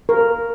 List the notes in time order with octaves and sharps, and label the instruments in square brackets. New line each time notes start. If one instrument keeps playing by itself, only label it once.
[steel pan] A#4